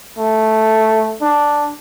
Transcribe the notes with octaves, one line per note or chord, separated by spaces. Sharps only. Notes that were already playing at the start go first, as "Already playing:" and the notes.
A3
D4